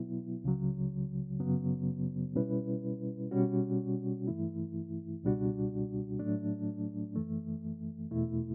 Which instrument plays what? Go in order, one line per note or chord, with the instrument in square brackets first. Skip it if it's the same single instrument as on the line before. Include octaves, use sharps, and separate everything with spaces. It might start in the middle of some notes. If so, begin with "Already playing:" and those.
Already playing: [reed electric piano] B2 F#3 B3 E4
C#2 C#3 F#3
F#2 C#3 F#3 B3
B2 G3 C#4 E4 B4
B2 G3 C#4 F#4
G2 E3 A3 E4
C#2 B2 G3 D4 F#4
A2 F#3 A3 D4
F#2 E3 A3
E2 B2 A3 E4